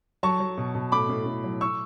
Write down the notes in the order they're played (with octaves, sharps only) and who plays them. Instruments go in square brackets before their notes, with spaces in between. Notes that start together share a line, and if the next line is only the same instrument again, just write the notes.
[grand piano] F#3 A5 C#6
F#3
B2
B2
A2 B5 D6
A2
A2
F#3
C#6 E6